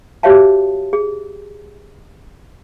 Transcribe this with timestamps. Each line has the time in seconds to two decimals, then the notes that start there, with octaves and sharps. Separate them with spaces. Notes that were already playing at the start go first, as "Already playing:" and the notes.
0.23 F#4 G4 C#5 E5 F5 A5
0.93 G#4